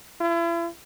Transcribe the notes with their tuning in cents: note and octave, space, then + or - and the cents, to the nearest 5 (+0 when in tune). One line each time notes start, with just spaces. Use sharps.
E4 +40